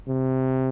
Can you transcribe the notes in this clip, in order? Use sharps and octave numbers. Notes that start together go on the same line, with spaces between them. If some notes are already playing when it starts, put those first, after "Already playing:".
C3